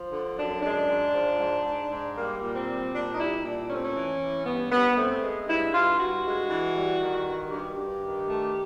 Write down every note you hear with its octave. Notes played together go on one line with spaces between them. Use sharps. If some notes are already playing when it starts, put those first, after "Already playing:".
Already playing: F3
D3
F#2 D4
G#3 D4
G#2
F3
G#2
G#2
G#2
G3 A#3
A#2
C4
G3
A#2 D4
D#4
G3 E4
A#2 D4
A3 C#4
C4
C#4
E3
E3
G2 B3
G2 B3
A3 C4
G#3
G2 E4
G2 F4
G2 F#4
G#3
E3
G3
D#3
G2
G2 G4
G2
D#3
A3